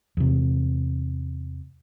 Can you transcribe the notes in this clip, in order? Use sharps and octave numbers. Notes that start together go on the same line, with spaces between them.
E2 C3